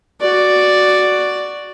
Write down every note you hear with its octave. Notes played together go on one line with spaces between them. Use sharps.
F#4 D5